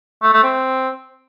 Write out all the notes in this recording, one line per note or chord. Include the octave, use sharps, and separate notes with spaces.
A3
A3
C4